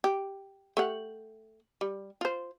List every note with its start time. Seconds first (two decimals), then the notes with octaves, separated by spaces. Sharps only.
0.04 G4
0.77 A3 G4 F#5
1.81 G3
2.21 F4 C5